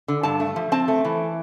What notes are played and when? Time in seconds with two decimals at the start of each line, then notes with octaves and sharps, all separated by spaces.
0.08 D3
0.23 G2 A5
0.40 A3
0.56 F3
0.72 C4 A5
0.88 A3
1.05 E3